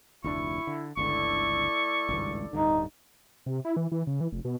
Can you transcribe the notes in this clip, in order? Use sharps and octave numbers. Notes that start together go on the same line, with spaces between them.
F1 D2 D4 E4 C#6
D3
G1 C#2 D3 A3 E4 D5 C#6
G#1 C#2 G2
D1 G2 D3 D#4
C3
E4
E3
E3
C#3
E3
F1
B2